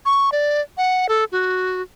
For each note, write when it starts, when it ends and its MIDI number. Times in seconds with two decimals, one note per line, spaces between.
0.06 0.30 85
0.32 0.61 74
0.77 1.07 78
1.09 1.24 69
1.32 1.82 66